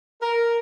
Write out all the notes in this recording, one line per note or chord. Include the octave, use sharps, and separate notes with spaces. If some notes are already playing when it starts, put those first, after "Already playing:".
A#4